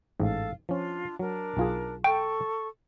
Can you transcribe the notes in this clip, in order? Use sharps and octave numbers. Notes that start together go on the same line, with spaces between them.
A1 G#2 A4 F5
F3 C#4 D4 F4
F#3 D4 A#4
B1 F4 G#4
A4 G5 C#6